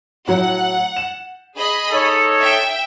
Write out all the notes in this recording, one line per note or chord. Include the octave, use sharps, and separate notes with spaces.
A2 F#3 F#5
E7
G#4 D#5 B5
D#4 A4 C#5
E5 G5